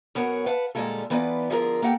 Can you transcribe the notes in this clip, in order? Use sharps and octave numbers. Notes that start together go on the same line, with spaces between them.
F#2 B3 A#4 C#5 F#5
B4 F5 F#5 A5
A#2 D3 G3 G#3 F4 A4
E3 B3 D#4 F4 B4 D5
D3 F3 F4 G#4 A#4 A#5
A#3 G4 A4 F#5 G5